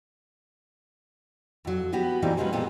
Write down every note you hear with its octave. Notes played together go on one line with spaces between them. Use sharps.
F2 F#3
B3 F#4 G4 B4
A#2 E3 G3 A#3 C4 D#4
F3 F#3 G#3 B3 C#4 B4
A#2 G#3 B3 C4 F4 A4